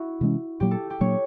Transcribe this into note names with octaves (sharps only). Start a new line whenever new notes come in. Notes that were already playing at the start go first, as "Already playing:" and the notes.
Already playing: E4 F#4
C3 E3 G#3 C#4
A#2 F#3 A#3 G4
A4
G4
A#2 F#3 A#3 D4 C#5